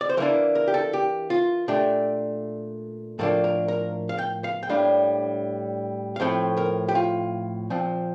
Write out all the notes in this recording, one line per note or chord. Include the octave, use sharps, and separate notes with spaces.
D5
C5
E3 A#3 D4 A#4
A#4
G4
A4
G4
F4
A#2 A3 D4 G4
A2 F3 A#3 D4 A4
A#4
A#4
F5
G5
F5
G5
A2 G3 A#3 D4 F5
F5
A2 F3 A3 C4 G5
A#4
G4
F4
A#2 F3 C4